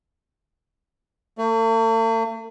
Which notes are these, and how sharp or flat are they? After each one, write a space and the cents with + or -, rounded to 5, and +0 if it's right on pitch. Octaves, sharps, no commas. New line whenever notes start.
A3 +45